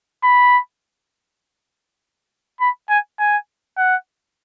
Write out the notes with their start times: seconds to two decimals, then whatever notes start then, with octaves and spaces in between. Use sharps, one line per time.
0.23 B5
2.60 B5
2.89 G#5
3.19 G#5
3.78 F#5